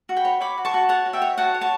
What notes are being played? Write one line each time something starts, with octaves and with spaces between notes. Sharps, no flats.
F#4
G5 B5
C#5
C#5 B5 D6
F#4
A5 C#6
F#4
C#5 F#5 A5
F#4
E5 G5
C#5
F#4 F#5 A5
C#5
A5 C#6